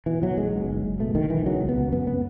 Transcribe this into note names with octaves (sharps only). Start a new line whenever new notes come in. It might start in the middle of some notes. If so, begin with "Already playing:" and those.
B2 E3
B2 F#3
B1 G#3
F#1
F#1
F#1
B2 A3
B1 D#3
B1 E3
C#3 F#3
C#2
B3
C#3
F#2 B3
B3